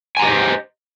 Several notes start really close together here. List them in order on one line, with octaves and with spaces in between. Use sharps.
G#5 A#5 G4 D#5 C5